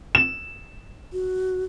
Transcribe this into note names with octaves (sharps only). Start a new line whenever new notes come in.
E7
F#4